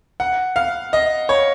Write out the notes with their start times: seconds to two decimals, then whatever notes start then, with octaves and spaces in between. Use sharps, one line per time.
0.20 F#5
0.56 F5
0.93 D#5
1.29 C#5